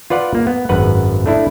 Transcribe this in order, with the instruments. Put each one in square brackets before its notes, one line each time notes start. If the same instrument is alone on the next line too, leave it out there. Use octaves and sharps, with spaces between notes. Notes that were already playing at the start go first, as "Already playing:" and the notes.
[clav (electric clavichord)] F4 B4 D5 F#5
A#3
B3
G#1 F#2 B4 F#5
A3 D4 E4